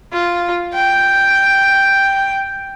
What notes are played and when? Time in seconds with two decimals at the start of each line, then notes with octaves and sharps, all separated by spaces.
0.12 F4
0.74 G5